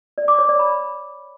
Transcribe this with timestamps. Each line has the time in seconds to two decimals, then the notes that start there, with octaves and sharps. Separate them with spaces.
0.18 D5
0.28 D6
0.38 C#5
0.49 D5
0.59 B5